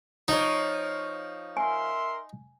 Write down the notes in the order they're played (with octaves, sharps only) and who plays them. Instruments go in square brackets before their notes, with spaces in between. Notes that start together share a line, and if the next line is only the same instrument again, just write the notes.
[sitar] F3 C#5 [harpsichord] D#4
[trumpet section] A#4 E5 C6 [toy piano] G#5